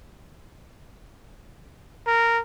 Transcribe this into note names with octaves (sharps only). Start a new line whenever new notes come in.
A#4